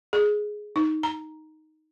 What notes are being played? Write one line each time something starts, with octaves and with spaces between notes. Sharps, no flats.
G#4
D#4
A#5